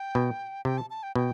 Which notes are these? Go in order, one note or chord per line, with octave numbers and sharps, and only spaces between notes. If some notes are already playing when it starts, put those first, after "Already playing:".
Already playing: G5
B2
C3 G5
A5
A5
G5
B2 G5